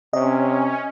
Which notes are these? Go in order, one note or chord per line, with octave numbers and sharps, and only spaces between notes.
C3 C#4 D#5